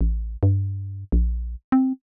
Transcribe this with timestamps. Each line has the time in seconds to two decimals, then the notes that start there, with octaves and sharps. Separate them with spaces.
0.01 A1
0.43 G2
1.12 A#1
1.72 C4